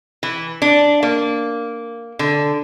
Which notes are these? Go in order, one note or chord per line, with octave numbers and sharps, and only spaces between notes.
E3
D4
A#3
D3